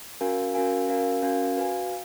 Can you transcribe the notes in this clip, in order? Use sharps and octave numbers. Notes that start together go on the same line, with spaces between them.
C#4 F#4 A#4 F5 G#5
C#4 F#4 A#4 F5 G#5
C#4 F#4 A#4 F5 G#5
C#4 F#4 A#4 F5 G#5
F#4 B4 F5 G#5